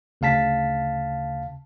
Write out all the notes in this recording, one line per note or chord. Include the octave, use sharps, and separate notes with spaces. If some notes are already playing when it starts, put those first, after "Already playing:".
D2 C#3 F5 A5 B6